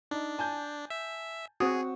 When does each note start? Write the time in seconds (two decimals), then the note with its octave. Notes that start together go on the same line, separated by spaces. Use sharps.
0.11 D4 D#4
0.39 G#5 A5 G6
0.90 E5
1.60 C4 F#4 G#4 D#6